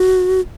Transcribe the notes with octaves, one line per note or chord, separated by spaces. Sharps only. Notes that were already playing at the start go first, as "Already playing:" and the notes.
Already playing: F#4